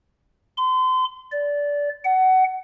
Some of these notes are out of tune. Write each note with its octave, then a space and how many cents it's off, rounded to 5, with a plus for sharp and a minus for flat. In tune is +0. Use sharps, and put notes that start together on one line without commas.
C6 -35
D5 -20
F#5 +20